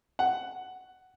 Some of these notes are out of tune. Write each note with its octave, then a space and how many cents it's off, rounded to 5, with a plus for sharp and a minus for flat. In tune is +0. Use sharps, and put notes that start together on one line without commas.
F#5 +10